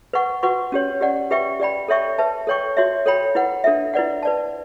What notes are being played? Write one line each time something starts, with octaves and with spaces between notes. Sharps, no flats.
B4 F#5 C#6
F#4 B4 F#5 C#6
C#4 G4 C#5
G4 D5 F#5
G4 B4 E5 G5 C#6
G4 D5 G5 B5
A4 C#5 E5 G5 C#6
B4 E5 A5
A4 C#5 G5 C#6
F#4 C#5 E5
A4 C#5 G5 B5
E4 B4 F#5
D4 A4 E5
E4 B4 D5 F#5
B4 D5 A5